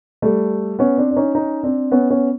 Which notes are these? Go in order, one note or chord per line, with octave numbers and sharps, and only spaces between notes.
G3 A3
B3 C#4
C4 D4
D4
C#4 D#4
C#4 D#4
C4 D4
B3 C#4
B3 C#4